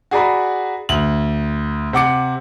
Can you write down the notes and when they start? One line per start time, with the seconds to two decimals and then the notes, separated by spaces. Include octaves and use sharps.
0.11 F#4 G#4 D5 A#5 B5
0.89 D2 F#7
1.93 C3 F#5 D6 C#7